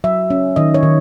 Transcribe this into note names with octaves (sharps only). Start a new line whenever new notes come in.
F#3 E5
C#4
D#3 D#5
C#5
D#3